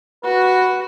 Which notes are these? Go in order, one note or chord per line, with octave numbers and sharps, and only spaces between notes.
F#4 B4